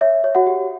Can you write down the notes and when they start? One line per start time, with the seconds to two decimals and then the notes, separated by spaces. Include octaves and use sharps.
0.01 C#5 E5
0.24 C#5
0.35 F#4 F#5
0.47 G4